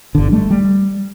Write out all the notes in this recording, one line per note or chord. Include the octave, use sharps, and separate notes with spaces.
G1 D3
G3 A3
G3